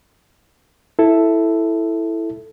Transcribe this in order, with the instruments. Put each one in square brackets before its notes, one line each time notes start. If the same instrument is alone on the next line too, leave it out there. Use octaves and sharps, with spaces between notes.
[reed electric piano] E4 A4